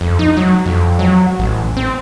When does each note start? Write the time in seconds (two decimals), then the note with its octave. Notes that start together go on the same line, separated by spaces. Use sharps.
0.01 F2
0.19 D#4
0.37 F#3
0.66 F2
0.99 F#3
1.39 A1
1.77 C4